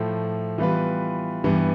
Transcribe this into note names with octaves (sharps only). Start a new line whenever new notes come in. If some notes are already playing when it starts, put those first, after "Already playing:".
Already playing: A2 F3 A3
E3 G3 B3 F4 B4
G2 E3 G3 B3